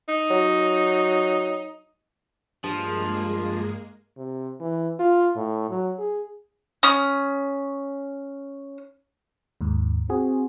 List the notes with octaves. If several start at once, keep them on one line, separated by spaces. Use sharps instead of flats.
D#4
F#3
G2 F3 G#3 A#3 G#4
C3
E3
F4
A2
F#3
G#4
C#4 D#6
D#2 G#2
C4 F#4 G#4